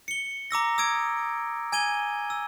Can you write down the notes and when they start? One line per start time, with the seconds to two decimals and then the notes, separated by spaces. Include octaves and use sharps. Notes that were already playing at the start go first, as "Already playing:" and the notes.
0.08 C#7 G7
0.51 A#5 D6 E6 A#6
0.78 D#6 E6 G#6 D7
1.72 G#5 G#6 D#7 G7
2.30 E6